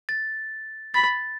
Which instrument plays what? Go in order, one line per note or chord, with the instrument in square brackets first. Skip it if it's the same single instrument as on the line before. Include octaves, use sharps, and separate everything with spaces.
[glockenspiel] A6
[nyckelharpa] B5 [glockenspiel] A6